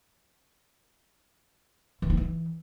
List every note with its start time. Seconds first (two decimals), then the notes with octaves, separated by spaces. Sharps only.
2.02 E3
2.10 D#4
2.17 E3